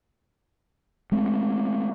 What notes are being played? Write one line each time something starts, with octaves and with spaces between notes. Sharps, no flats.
G#3 A3 C4